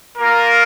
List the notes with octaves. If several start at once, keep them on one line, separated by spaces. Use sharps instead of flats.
A#3 F4 A#4